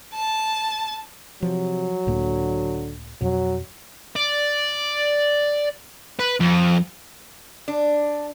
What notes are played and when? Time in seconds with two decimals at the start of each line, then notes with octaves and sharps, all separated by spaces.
0.13 A5
1.42 C3 F3 F#3
2.07 C#2 A2 D3 A#3
3.21 F2 B2 F#3
4.16 D5
6.20 B4
6.40 F2
7.68 D4